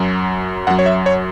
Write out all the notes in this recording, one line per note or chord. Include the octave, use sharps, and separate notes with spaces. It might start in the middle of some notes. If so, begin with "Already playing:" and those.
Already playing: F#2 F#3
F#2 F#3 F#5
C#5
E5
C#5